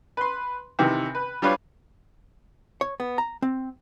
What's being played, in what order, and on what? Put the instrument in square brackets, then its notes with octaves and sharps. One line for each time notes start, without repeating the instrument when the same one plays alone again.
[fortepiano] B4 C6
C3 D#3 E3
B4
G3 D4 F4 B4 C#5
[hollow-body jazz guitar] C#5
B3
A#5
C4